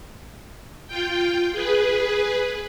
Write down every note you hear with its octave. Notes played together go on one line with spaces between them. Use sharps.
F4 G5
G#4 B4